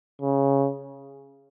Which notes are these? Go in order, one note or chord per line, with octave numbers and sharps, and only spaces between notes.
C#3